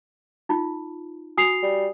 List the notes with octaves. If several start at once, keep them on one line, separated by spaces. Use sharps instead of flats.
D#4 F4
F#4 G#5 D#6 C7 F7
G3